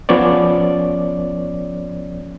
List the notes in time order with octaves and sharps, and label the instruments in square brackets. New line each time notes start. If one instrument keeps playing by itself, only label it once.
[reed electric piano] F3 B3 C#4 C#5 D5